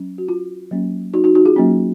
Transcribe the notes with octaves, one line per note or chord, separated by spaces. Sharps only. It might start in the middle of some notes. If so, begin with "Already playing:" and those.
Already playing: F#3 C#4
F#4
F4
F#3 A#3 C#4
D#4 F#4
D#4 F#4
D#4 F#4
F4 G#4
F#3 A#3 C#4